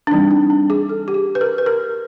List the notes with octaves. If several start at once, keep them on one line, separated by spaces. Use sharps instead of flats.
D4
E3 G3 C4 D#4
D4
D4
G#4
A4
G4
G#4
B4
A#4
B4
A#4